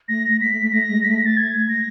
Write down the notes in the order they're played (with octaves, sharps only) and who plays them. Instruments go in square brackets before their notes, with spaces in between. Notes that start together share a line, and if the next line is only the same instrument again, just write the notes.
[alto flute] A3 [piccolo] A#6
[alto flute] A3 [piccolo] B6
[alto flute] A3
A3
[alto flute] A3 [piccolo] A#6
[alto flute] G#3
[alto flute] A3 [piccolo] B6
[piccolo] A#6
A6
[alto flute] A3 [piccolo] G#6
[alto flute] A3 [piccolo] A#6